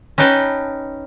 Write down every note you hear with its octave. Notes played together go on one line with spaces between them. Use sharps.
C#4 D#4 B4 G5 A5